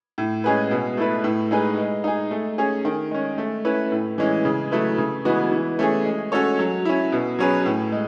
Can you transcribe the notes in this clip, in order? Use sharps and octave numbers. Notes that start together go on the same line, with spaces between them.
A2
G#3 C#4 G#4 B4
B2
A3 E4 B4
A2
G#3 D#4 G#4 B4
G#3
D#4 G#4
A3
C#4 G#4
D#3
G#3 C#4
A3
C#4 E4 B4
A2
E3 G#3 C#4
C#3
F#3 A3 E4 B4
C#3
E3 G#3 B3 F#4
E3
A3 C#4 G#4
G#3
C#4 F#4 A4 C#5
F#3
C#4 E4
B2
F#3 C#4 G#4 B4
A2
G#3